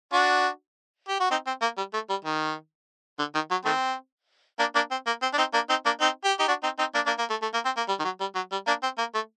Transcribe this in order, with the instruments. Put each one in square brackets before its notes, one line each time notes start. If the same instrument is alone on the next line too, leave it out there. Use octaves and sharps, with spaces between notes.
[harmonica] D4 F#4
G4
F#4
C4 D#4
C4
A#3
G3
A3
G3
D#3
D3
D#3
F#3
D#3 A3 C4
A#3 D4
A#3 D4
C4
A#3
C4
D4
C4 D#4
A#3 D4
C4 D#4
A#3 D4
C4 D#4
G4
D#4 G4
D4 F#4
C4 D#4
C4 D#4
A#3 D4
A#3 D4
A#3
A3
A3
A#3
C4
A#3
G3
D#3
F#3
G3
F#3
G3
A#3 D4
C4
A#3
A3